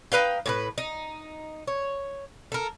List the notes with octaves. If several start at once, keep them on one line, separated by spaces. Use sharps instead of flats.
D#4 B4 F5 G5
A2 G4 B4
D#4
C#5
A4 A#4